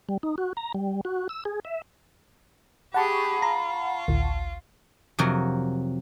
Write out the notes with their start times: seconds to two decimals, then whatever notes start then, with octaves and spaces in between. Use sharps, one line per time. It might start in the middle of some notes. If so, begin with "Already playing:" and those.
0.09 G3
0.23 D#4
0.38 F#4
0.57 A#5
0.74 G3
1.05 F#4
1.29 E6
1.45 G#4
1.65 E5
2.94 G4 G#4 F#5 A5 B5 C#6
3.42 F4 A#5
4.08 A1 D2
5.19 F2 C3 F#3 A#4